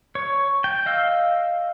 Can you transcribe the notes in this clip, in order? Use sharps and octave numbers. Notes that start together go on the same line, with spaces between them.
C#5
G5
D#5 F5 E6